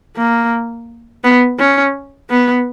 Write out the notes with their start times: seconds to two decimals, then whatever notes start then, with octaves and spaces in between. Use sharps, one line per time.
0.17 A#3
1.24 B3
1.59 C#4
2.30 B3